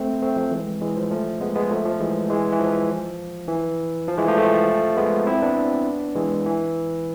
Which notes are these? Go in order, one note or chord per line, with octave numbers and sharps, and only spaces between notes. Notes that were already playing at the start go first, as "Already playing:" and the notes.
Already playing: A3 C4
A3 C4
F3 A3
E3 G#3
E3 G#3
F3
F3 A3
G#3 B3
G#3 B3
F3 A3
F3
E3 G#3
E3 G#3
E3
F3
E3
F3
E3 G#3
F3 A3
F3 A3
G#3 B3
C4 E4
B3 D4
E3 G#3
E3